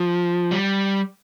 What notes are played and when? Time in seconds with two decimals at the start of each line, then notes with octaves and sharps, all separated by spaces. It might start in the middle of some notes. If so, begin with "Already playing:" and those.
Already playing: F3
0.51 G3